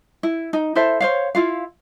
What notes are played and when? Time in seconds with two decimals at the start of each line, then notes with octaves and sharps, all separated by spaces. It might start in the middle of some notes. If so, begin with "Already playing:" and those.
0.23 E4
0.53 D#4
0.75 E4 A4 C5 E5
1.00 C5 C#5 F5
1.35 E4 F4 F5